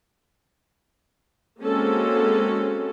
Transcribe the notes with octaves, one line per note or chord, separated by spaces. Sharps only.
G#3 A#3 C4 C#4 F#4 A4